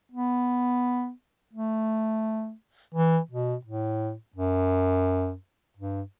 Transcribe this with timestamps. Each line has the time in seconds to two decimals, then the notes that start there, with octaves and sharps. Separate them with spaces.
0.12 B3
1.54 A3
2.94 E3
3.31 B2
3.65 A2
4.36 F#2
5.77 G2